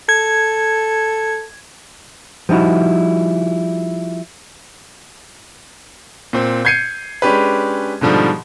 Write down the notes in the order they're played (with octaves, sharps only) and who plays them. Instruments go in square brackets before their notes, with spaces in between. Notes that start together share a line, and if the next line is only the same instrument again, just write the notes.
[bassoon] A4 [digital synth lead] G#6
[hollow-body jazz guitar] F3 G3 D#4 E4 F#4
[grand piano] A#2 C4
G6 G#6 C7 C#7 D#7
G#3 C#4 D4 G4 B4
G#2 B2 D3 F3 G3